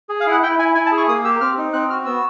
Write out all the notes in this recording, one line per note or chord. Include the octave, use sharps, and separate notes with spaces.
G#4
F5
E4 F#5
E4 G5
E4 G#5
E4 G#5
A5
G#4
C#6
A#3 D#6
G4 E6
C4 F6
D#4
C4 F#6
F#4 F6
B3 E6